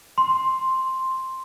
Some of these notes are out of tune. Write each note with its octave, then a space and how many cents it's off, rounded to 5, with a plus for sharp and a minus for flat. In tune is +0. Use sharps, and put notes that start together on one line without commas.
C6 +5